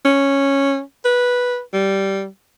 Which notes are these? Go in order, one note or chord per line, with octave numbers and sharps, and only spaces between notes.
C#4
B4
G3